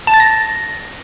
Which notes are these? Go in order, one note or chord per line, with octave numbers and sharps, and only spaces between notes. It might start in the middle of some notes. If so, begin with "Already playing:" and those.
A5
A6
A#6